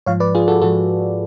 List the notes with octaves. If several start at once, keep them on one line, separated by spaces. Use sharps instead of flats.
G#2 F3 C#5 F5
B4 D5
F4 G#4
F#4 A4
G#2 F3 F#4 A4